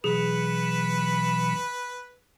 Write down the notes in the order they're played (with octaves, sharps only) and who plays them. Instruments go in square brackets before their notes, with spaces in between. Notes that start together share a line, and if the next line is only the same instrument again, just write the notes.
[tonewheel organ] B2 E3 F#3 [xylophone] G#4 [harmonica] B4